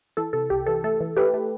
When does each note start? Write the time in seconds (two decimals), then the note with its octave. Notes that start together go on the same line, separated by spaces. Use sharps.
0.17 E3 A4
0.33 C3 A4
0.50 C2 G4
0.66 E3 A4
0.84 A3 A4
1.00 E3
1.17 A3 G4 B4
1.34 A3